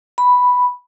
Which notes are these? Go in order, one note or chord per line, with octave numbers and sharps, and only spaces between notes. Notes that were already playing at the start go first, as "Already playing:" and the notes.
B5